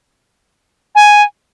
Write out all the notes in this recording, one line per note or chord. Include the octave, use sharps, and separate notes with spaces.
G#5